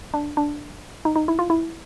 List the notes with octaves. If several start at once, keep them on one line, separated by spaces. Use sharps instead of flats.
D4
D4
D#4
D#4
E4
F4
E4